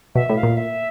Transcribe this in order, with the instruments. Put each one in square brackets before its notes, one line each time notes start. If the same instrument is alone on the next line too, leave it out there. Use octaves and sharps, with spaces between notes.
[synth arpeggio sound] B2 [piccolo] E5
[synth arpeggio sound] A2
[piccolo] F5
[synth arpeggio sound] A#2
[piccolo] E5